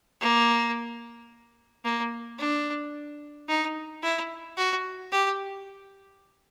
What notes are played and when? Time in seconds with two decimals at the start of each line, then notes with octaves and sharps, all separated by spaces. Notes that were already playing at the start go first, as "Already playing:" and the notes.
0.21 A#3
1.85 A#3
2.39 D4
3.48 D#4
4.03 E4
4.57 F#4
5.12 G4